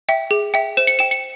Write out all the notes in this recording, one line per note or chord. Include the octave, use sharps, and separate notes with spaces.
E5 G5
G#4
E5 G5
C5 E7
C#7
G5 E7
C#7